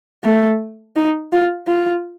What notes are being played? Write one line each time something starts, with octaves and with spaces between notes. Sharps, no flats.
A3
D#4
F4
F4